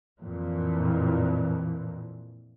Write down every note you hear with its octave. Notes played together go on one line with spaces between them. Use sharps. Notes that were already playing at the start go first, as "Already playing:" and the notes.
F2 A#2 E3